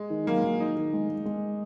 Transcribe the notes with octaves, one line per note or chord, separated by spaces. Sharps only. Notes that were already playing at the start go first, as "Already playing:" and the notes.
Already playing: G#3
D#3
F#3 A#3
F#3
D#3 D#4
D#3
G#3
G#3
G#3